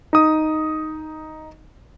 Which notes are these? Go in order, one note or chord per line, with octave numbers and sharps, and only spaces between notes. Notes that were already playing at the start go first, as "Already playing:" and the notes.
D#4 D#6